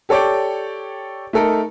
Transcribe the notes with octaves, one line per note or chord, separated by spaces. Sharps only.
G4 A4 C#5 D5 G5
A3 D#4 A4 A#4